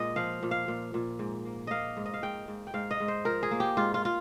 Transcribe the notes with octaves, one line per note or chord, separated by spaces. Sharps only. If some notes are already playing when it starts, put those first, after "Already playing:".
Already playing: A#2 G#3 D#5
F3 F5
A#2
F5
A#2
A#2
G#2
A#3
A#3 D#5 F5
G#2
D#5
F5
G#2 G5
G#2
G5
G#2 F5
D#5
G#2
C5
F3 A#4
G#4
A#3
G4
G#2 F4
F4
F4